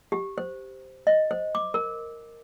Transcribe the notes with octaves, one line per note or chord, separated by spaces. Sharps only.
G4
C5
D#5
C5
D6
A#4